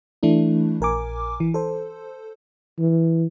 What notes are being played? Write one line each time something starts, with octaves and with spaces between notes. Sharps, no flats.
E3 A3 D4 E4
A#1 A#4 G#5 D6
E3
A4 C5
E3